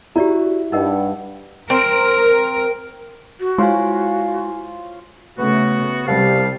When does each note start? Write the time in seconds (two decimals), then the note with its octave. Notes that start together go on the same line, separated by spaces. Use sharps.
0.16 E4 F#4 G4 D5 A#5
0.72 G2 D#4 A#4 D#5 F#5
1.70 C4 A#4
3.40 F#4
3.58 G#3 E4 F4 C5 C#5 F5 G#5
5.38 C#3 A3 B3 F#4
6.07 C2 C3 G3 F5 A5